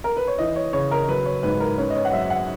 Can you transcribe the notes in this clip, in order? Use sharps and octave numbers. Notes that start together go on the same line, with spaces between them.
A#4
B4
C#5
E3 D#5
C#5
C#3 C#5
A#4
F#3 B4
C#5
G#2 B4
A#4
C#4 B4
D#5
C#5
F#5
F#2 E5
F#5